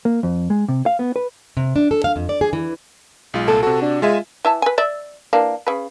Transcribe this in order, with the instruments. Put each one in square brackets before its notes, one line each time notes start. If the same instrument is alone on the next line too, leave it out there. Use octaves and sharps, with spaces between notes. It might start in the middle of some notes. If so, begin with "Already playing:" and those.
[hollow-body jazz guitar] A#3
F2
G#3
C3
F5
B3
B4
[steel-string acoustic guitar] C3
D4
A4
F5
F2
D5
G#4
E3
[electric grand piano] B1 G#3 F4
[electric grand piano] C2 A#2 [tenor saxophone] A4
[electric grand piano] C3 F#4 [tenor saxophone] A4
[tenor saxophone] D4
[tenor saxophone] G#3 [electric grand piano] F4 E5 G#5
[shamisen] E3 E5 A5
B4 G#5
D5 E5
E3 A#3 D4
C#3 B4